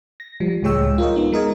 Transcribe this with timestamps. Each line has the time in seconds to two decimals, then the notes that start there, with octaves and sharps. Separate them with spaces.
0.20 A#6
0.40 F3 G3
0.63 C#2 A2 G#3 C#5 G5 E6
0.98 F4 A#4 C#5 D#5
1.16 B3 D#4
1.32 G#3 A#4 D#5 G#6